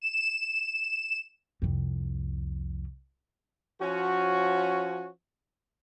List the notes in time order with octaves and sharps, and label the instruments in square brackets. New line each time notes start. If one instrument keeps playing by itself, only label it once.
[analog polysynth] E7
[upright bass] C2 F2
[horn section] F3 C#4 F#4